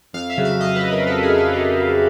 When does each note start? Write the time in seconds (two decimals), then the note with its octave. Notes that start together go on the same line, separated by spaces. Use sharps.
0.13 F2 F5
0.30 E5
0.38 C#3 F#3
0.45 F5
0.60 F2 D#5
0.76 B4
0.84 C#3 F#3
0.92 A#4
1.07 F2 A4
1.23 G#4
1.30 C#3 F#3
1.38 A4
1.53 F2 G4
1.77 C#3 F#3